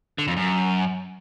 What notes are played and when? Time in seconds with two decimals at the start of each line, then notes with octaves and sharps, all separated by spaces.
0.18 D3
0.28 F2
0.37 F#2